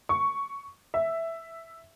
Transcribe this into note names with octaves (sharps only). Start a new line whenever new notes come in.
C#6
E5